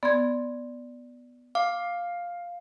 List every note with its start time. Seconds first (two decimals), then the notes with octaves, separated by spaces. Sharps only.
0.03 B3 D5 C6 G#6
1.55 F5 D6